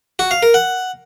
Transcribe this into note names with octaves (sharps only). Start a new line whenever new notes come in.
F#4
F5
A#4
F#5